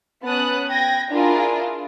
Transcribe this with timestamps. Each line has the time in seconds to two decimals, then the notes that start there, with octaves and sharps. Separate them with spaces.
0.25 B3 C#4 A5 D#6 F#6
0.70 G5 G#6 A#6
1.12 D4 E4 F4 G#4 A#4